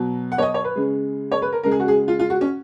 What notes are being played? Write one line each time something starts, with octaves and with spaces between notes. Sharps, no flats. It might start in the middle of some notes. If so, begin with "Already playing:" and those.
Already playing: B2 F#3
F#5
C#5
D#5
C#5
B4
C#3 G#3
C#5
B4
A#4
C#3 G#3 A#4
G#4
F#4
G#4
F4
F4
F#4
C#4